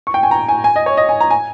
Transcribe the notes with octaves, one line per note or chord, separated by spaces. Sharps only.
C#6
G5
G#5
A#5
G#5
G#5
D#5
C#5
D#5
G#5
A#5
G#5